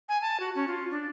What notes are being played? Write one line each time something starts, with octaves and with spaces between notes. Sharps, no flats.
G#5
A5
F#4
C#4
F4
D4